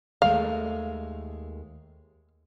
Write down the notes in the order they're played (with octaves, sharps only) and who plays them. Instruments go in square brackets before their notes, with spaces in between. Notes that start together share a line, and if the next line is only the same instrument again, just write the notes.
[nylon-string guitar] D#2 G#3 A3 [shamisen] F5